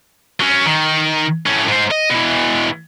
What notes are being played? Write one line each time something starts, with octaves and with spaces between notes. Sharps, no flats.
F#3 C#4
D#3
A2 C#4
G#2 C5
D#5
B2 E3